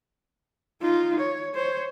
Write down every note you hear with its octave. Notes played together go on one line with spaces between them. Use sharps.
D#4 F4
C#5
C5 C#5